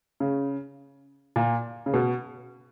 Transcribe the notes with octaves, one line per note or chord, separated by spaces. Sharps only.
C#3
A#2
C#3
B2